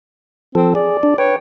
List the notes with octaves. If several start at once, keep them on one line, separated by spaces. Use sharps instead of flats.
F3 C4 A4
G#4 D5
D4
B4 C#5 G5